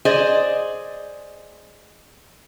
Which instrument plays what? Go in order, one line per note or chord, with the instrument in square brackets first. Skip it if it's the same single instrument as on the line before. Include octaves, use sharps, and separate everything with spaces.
[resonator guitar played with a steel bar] G#4 C5 D5 D#5